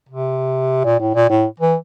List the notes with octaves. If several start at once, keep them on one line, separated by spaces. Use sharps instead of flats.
C3
A#2
A2
A#2
A2
E3